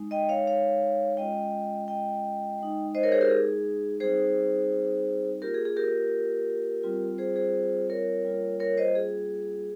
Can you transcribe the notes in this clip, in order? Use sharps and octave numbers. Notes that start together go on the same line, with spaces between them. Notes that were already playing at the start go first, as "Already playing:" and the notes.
Already playing: G#3 D#4
D#5 G5
C#5 F5
C#5 F5
G#3 C#4 F4 D#5 G5
D#5 G5
G#3 D#4
C5 D#5
A#4 C#5
G#4 C5
G4 A#4
G#4
G3 C4 D#4 G#4 C5
A#3 F4 G4 A#4
G#4
G#4
G4 A#4
G3 C4 F4
G#4 C5
G#4 C5
A#4 C#5
G3 A#3 C#4 F4
A#4 C#5
C5 D#5
G#4